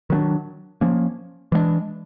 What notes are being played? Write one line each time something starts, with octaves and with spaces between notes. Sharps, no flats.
D#3 F#3 B3 D4
F3 A#3 C#4
E3 G#3 B3 D4